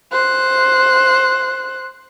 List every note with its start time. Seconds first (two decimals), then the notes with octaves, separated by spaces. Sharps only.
0.11 C5 F#6